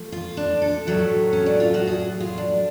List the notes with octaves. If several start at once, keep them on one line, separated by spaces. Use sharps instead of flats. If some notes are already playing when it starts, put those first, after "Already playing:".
Already playing: F3 A3
F4
D4
A4
A2 F#3 A3
C#4
D4
F4
F#4
G#4
F4
D4